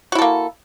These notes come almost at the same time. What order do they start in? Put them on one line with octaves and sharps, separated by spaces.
F#4 E4 A4 A#3